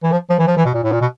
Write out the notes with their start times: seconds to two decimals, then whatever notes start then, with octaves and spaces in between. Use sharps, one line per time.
0.03 E3
0.12 F3
0.30 F3
0.39 E3
0.47 F3
0.57 E3
0.65 B2
0.74 A#2
0.84 A2
0.92 A#2
1.01 B2